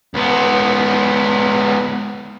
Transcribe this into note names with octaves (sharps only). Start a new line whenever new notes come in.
C#2 B3